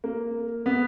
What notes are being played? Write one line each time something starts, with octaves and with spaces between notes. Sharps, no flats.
A#3
B3